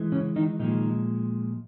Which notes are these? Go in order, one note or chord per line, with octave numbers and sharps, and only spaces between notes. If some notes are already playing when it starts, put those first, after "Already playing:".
Already playing: E3 G#3
C#3 C#4
D#3 D#4
A#2 D#3 F3 G#3 D#4